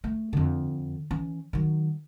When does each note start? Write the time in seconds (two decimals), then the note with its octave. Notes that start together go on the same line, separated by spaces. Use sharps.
0.04 A3
0.33 F2 D3
1.11 E3 C#4
1.53 D#3 F#3